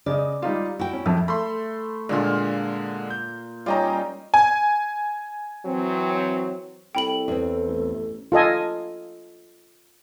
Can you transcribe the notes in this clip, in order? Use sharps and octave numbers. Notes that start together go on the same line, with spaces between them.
C#3 D5 D#5
G3 D#4 F4
E4 F#4 G5
C#4
F2 F3 E4 E6
A3 B5 C6
A#2 D3 G#3 F4
G6
G3 C#4 D#4 F4 D#5 A#5
G#5
E3 F#3 C4
C2 A4 G5 B5 F#7
E2 C4
A1
F4 A4 D#5 G#5